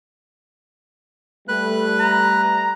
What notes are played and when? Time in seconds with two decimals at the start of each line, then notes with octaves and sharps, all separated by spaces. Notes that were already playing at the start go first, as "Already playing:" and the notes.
1.48 G3 A3 B4 F#6
2.00 A#5